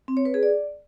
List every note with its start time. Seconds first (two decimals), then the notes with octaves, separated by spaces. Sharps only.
0.08 C4
0.17 C#5
0.25 B4
0.34 G#4
0.43 D5